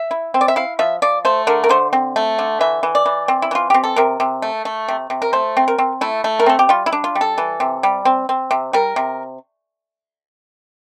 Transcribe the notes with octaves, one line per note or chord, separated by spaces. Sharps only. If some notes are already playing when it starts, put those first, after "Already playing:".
Already playing: E5
E4
C4
D5
E5
E4 F5
F3 E5
F3 D5
A3 C5
D3 A#4
A#4
D3 C5
C4
A3
D3
E3 E5
E3
D5
E3
C4
E4
E3 F4
C4 G4
A4
C3 A#4
C3
A3
A3
C3
C3
A#4
A3 C5
C4
A#4
C4
A3 E4
A3
A#4
C4 A4
G4
G3 F4
E4
D4
F4
G3
A4
E3
C3
G3
C4
C4
C3
G3 A#4
C3